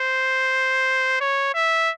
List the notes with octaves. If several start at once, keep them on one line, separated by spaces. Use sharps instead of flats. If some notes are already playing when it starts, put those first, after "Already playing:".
Already playing: C5
C#5
E5